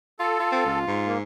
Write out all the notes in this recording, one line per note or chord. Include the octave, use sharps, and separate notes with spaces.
F4 A4
F4
C4
C#2
G#2
A#3